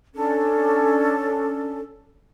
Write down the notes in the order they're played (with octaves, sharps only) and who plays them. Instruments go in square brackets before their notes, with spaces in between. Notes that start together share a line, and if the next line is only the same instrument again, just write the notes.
[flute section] C#4 D4 A4